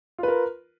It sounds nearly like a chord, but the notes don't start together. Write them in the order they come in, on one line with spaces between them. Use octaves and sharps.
F4 B4 A#4